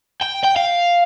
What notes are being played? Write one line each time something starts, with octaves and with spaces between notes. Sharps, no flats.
G5
G5
F5